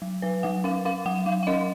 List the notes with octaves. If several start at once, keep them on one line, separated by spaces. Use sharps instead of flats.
F#3
F#3 B4
F#3 F#5
C#4 F5
C#4 F5
F#3 F#5
F#3 F5
F5
C#4 D#5